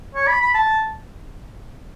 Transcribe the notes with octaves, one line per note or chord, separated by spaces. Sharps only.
C#5
B5
B5
A5